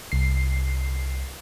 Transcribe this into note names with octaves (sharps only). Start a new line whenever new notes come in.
C2 C7